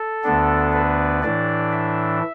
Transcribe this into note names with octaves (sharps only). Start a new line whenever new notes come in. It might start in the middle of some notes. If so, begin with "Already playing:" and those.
Already playing: A4
D2 D3 B3 D4
B4
A2 E3 D4 D5
E5